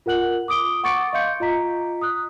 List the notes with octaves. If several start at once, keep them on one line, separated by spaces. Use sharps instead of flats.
F4 A#4 F#5 F#6 F#7
D6 D#6 D7 G7
F#5 C#6 D6 A6 C#7 D7
D#5 F5 C6 G6 C#7
F4 D#5 A#5 B6
D#6 F#6